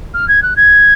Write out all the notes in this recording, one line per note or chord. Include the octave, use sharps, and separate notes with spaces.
F6
G#6
F#6
G#6